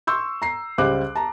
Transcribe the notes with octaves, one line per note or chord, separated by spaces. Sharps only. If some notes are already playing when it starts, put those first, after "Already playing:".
C6 C#6 E6 G6
A#5 C7
C#2 G3 C5 F5 D6 F#6
A5 A#5